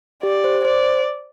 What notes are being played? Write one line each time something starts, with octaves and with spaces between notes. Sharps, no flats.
G4 D5
C5
C5
C5 D5